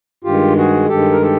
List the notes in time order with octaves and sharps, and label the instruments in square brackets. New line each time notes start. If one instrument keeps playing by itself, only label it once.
[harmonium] G2 D#3 G#3 F4 G4
F#4 G#4
G2 D#3 G#3 G4 A4
A#4
G4 A4